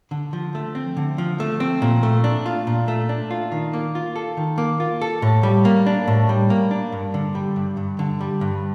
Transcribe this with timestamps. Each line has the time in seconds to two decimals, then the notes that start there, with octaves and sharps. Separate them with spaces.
0.11 D3
0.33 F3
0.55 A3
0.75 C4
0.97 D3
1.18 F3
1.40 A3
1.60 C4
1.82 A#2
2.03 A3
2.24 D4
2.46 F4
2.67 A#2
2.88 A3
3.09 D4
3.31 F4
3.52 D#3
3.73 A#3
3.95 F4
4.16 A4
4.37 D#3
4.58 A#3
4.80 F4
5.02 A4
5.22 A2
5.43 G3
5.65 A#3
5.86 D4
6.08 A2
6.29 G3
6.50 A#3
6.71 D4
6.92 G2
7.14 D3
7.35 G3
7.56 G2
7.77 G2
7.99 D3
8.21 G3
8.41 G2